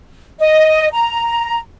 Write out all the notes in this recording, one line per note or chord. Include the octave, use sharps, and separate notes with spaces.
D#5
A#5